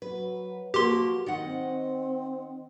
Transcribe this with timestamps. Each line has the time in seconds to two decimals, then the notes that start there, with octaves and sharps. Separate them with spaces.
0.02 F#3 B4
0.74 F3 A#3 F#4 G4 C6
1.26 D#3 D#5 F#5
1.44 C4